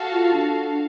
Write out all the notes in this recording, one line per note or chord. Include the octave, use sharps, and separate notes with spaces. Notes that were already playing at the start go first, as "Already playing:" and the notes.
Already playing: F#4 A4 F5 A5
F4
D4